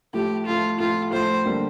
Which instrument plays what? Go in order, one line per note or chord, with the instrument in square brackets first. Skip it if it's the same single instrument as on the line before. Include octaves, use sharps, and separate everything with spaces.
[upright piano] A2 F3 A3 [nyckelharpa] G4
[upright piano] A2 F3 A3 [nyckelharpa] F4
[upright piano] A2 F3 A3 [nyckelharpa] F4
[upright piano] A2 F3 A3 [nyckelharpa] C5
[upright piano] D3 G3 A#3